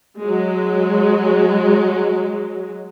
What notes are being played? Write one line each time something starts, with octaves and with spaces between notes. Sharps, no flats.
F#3 G#3